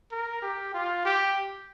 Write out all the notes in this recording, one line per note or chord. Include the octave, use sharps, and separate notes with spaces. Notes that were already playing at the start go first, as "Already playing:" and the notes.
A#4
G4
F4
G4